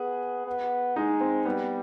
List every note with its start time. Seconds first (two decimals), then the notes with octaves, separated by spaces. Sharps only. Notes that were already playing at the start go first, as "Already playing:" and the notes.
Already playing: B3 G#4
0.46 B3
0.96 G#3 D#4
1.21 C4
1.45 G3 B3